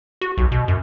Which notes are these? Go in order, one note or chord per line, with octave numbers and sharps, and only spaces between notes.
F#4
B1
B2
F#2